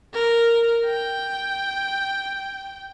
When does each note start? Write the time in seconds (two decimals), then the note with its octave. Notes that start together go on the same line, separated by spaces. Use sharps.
0.14 A#4
0.86 G5